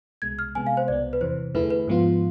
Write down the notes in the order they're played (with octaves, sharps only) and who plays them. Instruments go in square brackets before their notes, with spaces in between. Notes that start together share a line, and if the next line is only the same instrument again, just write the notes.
[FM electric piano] C2 B2 G#3 [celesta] G#6
[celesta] F6
[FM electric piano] C3 G#3 B3 [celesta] G#5
[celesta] F5
C5
[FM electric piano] C2 B2 B3 [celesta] D5
[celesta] B4
[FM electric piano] E2 C3 E3 [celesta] C5
[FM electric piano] E2 D3 A3 E4 G#4 [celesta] B4
[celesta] B4
[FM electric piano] G#2 F3 B3 F4